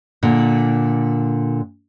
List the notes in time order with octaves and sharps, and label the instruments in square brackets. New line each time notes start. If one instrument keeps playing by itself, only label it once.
[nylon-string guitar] A#2 D3